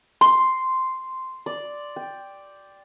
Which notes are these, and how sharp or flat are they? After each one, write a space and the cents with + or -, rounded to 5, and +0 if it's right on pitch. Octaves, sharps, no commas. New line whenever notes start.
C6 -5
D5 +0
G5 +5